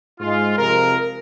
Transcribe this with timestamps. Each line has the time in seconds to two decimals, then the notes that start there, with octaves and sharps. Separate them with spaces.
0.20 G#2 G#3 F4
0.58 F2 C3 F3 G#3 A#4